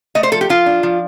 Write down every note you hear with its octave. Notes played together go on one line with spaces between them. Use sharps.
A3 D#5
C5
F3 A4
G4
F3 F4
D4
F3